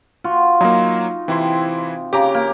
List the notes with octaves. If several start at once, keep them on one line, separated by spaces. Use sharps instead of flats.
F4 F#4
F#3 A#3 D#4
C3 E3 E4 C6
C#3 G4 A#5 D6
A#3